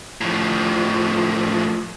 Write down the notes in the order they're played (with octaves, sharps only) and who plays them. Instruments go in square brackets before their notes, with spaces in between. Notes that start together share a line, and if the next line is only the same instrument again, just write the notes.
[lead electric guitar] A2 F3